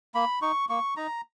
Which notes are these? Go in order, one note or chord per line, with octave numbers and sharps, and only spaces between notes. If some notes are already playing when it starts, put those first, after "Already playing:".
A#3 B5
D#4 C#6
A#3 C#6
D#4 A#5